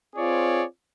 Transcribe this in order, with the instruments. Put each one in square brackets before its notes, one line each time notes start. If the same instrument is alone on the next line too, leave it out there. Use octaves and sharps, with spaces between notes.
[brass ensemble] C4 F4 G#4 C#5 D5